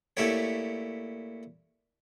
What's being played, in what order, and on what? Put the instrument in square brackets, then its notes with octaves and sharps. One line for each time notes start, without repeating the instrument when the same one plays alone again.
[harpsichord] A#2 A3 E4 G4 C#5